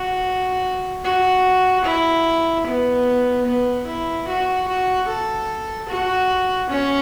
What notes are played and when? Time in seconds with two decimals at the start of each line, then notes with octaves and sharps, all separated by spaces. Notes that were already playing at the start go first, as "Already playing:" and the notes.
Already playing: F#4
1.04 F#4
1.84 E4
2.66 B3
3.46 B3
3.86 E4
4.27 F#4
4.68 F#4
5.07 A4
5.89 F#4
6.70 C#4